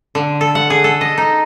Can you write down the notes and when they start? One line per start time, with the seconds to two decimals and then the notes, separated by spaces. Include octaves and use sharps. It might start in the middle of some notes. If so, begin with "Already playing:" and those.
0.15 D3
0.41 A4
0.55 F#5
0.70 G#4
0.84 A4
1.01 D#5
1.17 D#4